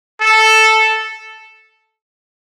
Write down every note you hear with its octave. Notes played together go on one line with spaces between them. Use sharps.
A4